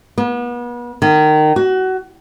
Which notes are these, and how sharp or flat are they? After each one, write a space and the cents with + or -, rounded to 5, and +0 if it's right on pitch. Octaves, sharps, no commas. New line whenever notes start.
B3 -35
D#3 -20
F#4 +25